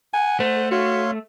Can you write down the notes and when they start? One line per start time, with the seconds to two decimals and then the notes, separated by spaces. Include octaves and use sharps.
0.14 F#5 G#5
0.40 A3 C5
0.71 F#4 C#5 F5 C6